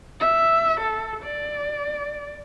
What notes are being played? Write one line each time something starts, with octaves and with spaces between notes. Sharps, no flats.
E5
A4
D5